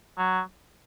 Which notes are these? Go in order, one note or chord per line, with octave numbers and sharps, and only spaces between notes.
F#3